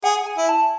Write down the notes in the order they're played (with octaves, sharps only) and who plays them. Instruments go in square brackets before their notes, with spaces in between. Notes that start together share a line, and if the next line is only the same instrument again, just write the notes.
[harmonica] G#4 [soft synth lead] F#5
[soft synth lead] G#5
[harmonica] E4
[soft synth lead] A5